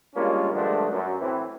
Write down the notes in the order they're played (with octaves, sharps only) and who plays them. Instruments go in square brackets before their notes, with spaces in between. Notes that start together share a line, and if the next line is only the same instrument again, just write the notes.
[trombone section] G3 G#3 A#3 C#4 D4 F4
G2 D3 F3 G#3 A3 D4
F#2
A2 E3 C4